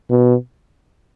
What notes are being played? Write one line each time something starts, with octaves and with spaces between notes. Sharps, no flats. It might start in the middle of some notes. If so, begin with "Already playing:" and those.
B2